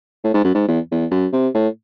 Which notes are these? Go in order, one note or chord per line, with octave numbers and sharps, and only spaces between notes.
A2
G#2
F#2
G#2
E2
E2
F#2
C3
A2